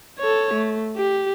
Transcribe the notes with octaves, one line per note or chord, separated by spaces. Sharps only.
A4 C#5
A3
G4